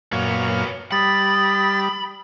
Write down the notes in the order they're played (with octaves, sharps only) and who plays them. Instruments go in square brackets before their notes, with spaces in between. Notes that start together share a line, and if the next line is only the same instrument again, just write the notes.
[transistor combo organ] F#2 A#2 F5 [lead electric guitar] B3 C#5
[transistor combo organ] G3 [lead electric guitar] B5 [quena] D#6 [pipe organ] A6